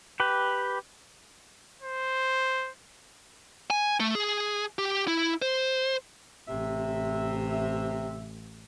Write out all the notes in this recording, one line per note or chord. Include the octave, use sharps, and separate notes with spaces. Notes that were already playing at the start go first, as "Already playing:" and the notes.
G4 B4
C5
G#5
A3
G#4
G4
E4
C5
A1 C3 E5